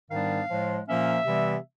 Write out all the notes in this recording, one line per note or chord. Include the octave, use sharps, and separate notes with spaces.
G#2 D#3 G3 B3 D4 F5
A2 F3 G#3
A#2 F3 A#3 C#4 E5
C3 E3 G3 B3